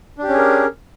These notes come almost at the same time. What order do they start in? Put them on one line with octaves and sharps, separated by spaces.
D4 G4 C#4 G#4 A#4